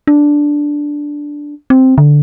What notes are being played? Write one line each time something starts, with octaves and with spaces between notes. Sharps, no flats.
D4
C4
D3